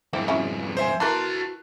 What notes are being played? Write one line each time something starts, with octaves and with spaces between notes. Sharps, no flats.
F2 G#2 A#3 C4 E4
F#3 C#4 E4
C5 E5 G#5
E3 F#4 A#4 A5 C6 F#6